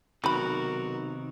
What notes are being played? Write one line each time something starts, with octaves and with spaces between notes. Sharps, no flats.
B1 C3 D#3 A3 F#4 A#4 B5